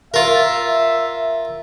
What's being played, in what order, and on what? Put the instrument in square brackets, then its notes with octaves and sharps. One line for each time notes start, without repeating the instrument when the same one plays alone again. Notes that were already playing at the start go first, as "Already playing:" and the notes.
[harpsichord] F4 A#4 [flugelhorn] E5